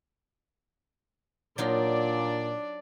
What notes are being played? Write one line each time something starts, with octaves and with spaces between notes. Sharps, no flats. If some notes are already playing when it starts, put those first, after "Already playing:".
A#2 F#3 D4 D#4 F4 D5